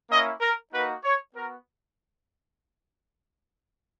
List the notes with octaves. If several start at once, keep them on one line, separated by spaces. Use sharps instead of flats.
A#3 C#4 E4 D#5
A#4
A#3 D#4 F#4 B4
C#5
B3 F#4 A#4